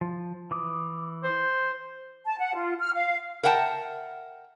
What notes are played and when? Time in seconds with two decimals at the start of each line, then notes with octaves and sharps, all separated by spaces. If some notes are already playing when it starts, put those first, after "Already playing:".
0.01 F3
0.51 E3 D6 D#6
1.24 C5
2.25 A5
2.39 F#5
2.55 F4
2.79 F6
2.94 F5
3.43 A#4 E5 F#5 G5 A5